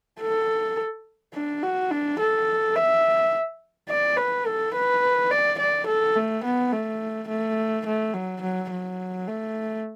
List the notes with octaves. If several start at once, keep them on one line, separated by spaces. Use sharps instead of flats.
A4
D4
F#4
D4
A4
E5
D5
B4
A4
B4
D5
D5
A4
A3
B3
A3
A3
A3
F#3
F#3
F#3
A3